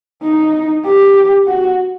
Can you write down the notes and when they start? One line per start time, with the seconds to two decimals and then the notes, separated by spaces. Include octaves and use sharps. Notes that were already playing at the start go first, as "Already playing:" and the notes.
0.23 D#4
0.85 G4
1.47 F#4